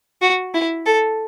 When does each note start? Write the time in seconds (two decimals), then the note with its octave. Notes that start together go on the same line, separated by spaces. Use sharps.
0.22 F#4
0.54 E4
0.86 A4